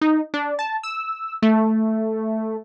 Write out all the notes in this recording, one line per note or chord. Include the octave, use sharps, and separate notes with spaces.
D#4
D4
A5
E6
A3